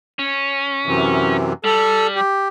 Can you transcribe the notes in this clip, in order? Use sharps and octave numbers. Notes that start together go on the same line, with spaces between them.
C#4
F#2 C3 E3
G3 A4
G4